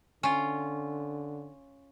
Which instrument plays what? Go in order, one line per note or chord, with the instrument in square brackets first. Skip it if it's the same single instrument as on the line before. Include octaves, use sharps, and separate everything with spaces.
[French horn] D3 [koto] C#4 F4